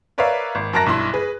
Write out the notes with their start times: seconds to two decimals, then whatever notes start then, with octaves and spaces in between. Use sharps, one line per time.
0.18 A#4 B4 C#5 D5 E5 F5
0.55 G#1
0.73 F#2 A#4 A5 F#6 A#6
0.86 B1 G2 E4 C6
1.14 G#4 B4